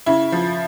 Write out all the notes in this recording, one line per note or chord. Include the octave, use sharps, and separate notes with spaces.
C#3 E4
F3